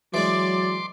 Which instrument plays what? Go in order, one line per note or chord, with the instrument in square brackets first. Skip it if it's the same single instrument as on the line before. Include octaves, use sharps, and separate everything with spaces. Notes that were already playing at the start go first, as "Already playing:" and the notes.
[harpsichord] E3 G#3 [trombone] F#3 [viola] D5 [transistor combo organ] C6 D6